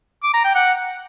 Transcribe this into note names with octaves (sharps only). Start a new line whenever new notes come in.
D6
A#5
G5
F#5